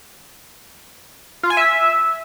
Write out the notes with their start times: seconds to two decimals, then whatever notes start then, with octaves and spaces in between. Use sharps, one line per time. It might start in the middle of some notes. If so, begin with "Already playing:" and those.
1.43 F4
1.50 G#5
1.57 E5